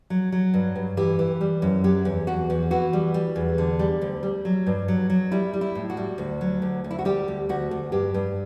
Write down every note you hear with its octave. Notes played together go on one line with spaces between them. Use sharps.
F#3
F#3
G2
G2
E3 G4
E3
G3
F#2
F#3 G4
E2
E2 F#4
E2
E3 F#4
G3
G3
E2
D3
G3
D2
G3
F#3
G2
F#3
F#3
G3 E4
G3
E4
A2
F#4
G3
D2
F#3
D2
D2
E4
F#4
G3 G4
D2
D2 F#4
D2
G2 G4
G2